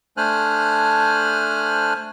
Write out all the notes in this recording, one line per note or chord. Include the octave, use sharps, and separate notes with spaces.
A3 D4 C5 G#5 F6 F#6